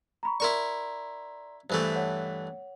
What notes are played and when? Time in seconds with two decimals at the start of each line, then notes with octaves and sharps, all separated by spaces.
0.23 A#5 B5 C#6
0.40 E4 A#4 D5 A#5 C6 C#6
1.70 G2 E3 A3 C5
1.96 C#5 F#5